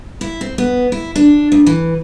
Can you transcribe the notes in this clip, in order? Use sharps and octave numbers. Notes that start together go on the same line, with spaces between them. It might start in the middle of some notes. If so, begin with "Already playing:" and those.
E4
C4
B3
E4
D4
D2
E3